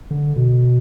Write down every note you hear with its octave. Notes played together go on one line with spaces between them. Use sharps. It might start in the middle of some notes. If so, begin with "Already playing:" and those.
D3
B2